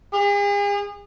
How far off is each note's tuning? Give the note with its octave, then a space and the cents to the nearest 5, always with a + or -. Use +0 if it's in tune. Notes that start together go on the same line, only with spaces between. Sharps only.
G#4 -40